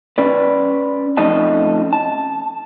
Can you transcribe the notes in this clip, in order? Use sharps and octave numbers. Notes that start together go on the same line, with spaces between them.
C#4 B4 D5
F2 A3 C#4 D#4 D#5 A5
A5